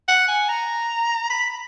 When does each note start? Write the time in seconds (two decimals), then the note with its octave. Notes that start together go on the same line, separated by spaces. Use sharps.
0.08 F#5
0.28 G#5
0.49 A#5
1.30 B5